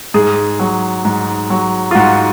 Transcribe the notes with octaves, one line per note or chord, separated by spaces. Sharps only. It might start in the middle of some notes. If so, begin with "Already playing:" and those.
G#2 G#4
F#3
G#2
F#3
F4
G#2 F#4